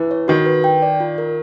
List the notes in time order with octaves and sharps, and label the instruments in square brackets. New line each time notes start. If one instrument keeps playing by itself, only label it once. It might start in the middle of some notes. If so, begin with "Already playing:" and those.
Already playing: [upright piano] E3 [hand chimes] E4
[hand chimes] C#5
[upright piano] D#3 [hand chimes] F#4
[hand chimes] B4
G5
D5
F4
A#4